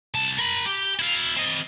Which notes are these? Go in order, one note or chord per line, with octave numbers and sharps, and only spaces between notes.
C2 A5
A#4 B5
G4
E4 F5
C4 D#5